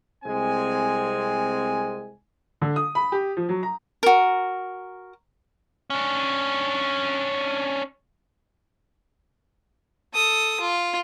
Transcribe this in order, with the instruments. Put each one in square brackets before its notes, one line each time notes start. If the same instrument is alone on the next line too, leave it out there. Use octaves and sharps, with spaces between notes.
[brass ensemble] C2 G#3 C4 G#5
[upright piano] D3
D#6
B5
G4
F3
F#3
A#5
[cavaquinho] F#4 A#4
[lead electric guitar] C#4 D4
[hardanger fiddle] A4 D#6
F4